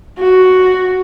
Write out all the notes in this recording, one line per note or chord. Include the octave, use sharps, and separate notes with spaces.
F#4